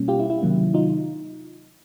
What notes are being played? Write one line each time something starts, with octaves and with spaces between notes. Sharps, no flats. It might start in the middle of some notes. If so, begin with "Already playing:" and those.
Already playing: B2 G3 A#3 C#4
F4 G4
E4
E4
C3 D#3 F#3 A#3 C#4
D#4 F4